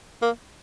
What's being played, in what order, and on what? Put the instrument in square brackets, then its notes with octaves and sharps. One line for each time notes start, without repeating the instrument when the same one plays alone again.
[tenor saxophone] A#3